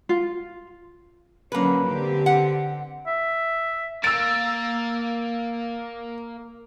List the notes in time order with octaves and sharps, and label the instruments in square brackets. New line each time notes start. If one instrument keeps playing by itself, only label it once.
[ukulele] F4
[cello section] D3 F#3 C#4 [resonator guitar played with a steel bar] A#3 B4
[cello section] D3 C4 G4
[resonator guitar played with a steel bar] F#5
[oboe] E5
[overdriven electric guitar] A#3 [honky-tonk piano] E6 D7 [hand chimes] A6